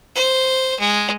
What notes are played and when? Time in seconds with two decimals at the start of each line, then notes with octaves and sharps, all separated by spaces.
0.16 C5
0.80 G#3